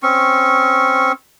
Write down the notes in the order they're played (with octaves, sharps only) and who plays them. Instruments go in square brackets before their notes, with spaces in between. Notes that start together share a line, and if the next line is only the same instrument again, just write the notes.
[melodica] C4 C#4 C#6